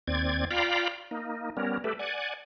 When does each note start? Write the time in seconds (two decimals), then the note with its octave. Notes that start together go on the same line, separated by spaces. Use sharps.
0.08 D#2 C4 D5 G#6
0.51 F4 D5 F5 G5 A#5 B5
1.11 A#3 D#4
1.57 G3 B3 C#4 A#4
1.84 A3 G4 A4 B4
1.99 D5 F#5 G#5